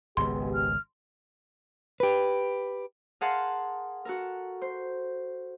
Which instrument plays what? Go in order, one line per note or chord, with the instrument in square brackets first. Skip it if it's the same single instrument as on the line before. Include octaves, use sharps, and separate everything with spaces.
[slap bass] G#1 C#2 [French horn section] B3 G4 G#4 [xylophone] C6
[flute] F6
[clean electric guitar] G4 B4
[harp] G#4 A#4 F5 F#5 A5 C6
F#4 A4 A#4
C5